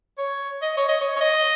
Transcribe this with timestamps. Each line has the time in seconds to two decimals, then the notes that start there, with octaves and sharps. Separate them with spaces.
0.18 C#5
0.62 D#5
0.77 C#5
0.89 D#5
1.01 C#5
1.16 C#5
1.21 D#5